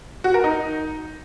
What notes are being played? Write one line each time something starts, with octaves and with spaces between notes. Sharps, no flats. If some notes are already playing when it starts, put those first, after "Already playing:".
F#4
A#4
D#4